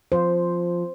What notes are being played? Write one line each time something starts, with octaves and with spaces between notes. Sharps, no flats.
F3 C5